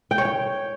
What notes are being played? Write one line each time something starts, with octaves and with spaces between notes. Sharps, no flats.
G5
C#5
G5